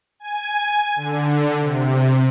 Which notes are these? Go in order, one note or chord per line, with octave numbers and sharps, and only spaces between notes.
G#5
D3
C3